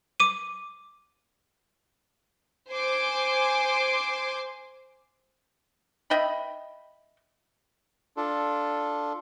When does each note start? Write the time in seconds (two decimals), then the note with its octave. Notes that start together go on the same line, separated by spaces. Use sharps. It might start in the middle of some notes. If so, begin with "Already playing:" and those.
0.20 D6 D#7
2.70 C5 G#5 C6 D6
6.10 D#5 E5 G5 B5
8.17 D4 F4 A4